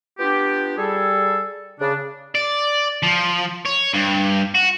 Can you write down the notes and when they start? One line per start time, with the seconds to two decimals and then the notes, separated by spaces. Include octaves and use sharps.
0.19 B3 D4 F4 G4
0.76 G3 G#4 A4
1.79 C#3 D4
2.35 D5
3.03 F3
3.65 C#5
3.93 G2
4.54 F#4